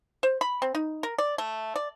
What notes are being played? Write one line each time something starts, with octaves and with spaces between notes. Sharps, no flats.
C5
B5
C4
D#4
A#4
D5
A3
D5